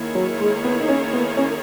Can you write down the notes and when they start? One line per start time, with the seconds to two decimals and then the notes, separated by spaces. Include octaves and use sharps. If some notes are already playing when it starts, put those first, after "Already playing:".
Already playing: D#3 A#3 E4 G#4 C#5
0.15 F#3
0.40 G#3
0.64 B3
0.81 D#4
0.89 C#4
1.13 B3
1.37 C#4